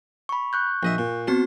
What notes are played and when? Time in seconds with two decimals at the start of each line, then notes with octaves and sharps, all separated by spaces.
0.29 B5 C#6
0.53 C#6 F#6 G6
0.83 A#1 D#5 E5
0.98 A#2
1.27 B3 C4 F#4 C5 A5